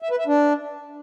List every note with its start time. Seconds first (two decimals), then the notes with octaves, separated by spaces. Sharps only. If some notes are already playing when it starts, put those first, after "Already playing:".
0.02 E5
0.11 B4
0.19 E5
0.27 D4